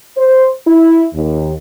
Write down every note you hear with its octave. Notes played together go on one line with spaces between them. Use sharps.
C5
E4
D#2